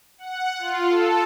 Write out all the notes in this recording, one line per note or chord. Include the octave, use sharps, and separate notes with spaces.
F#5
F4
A4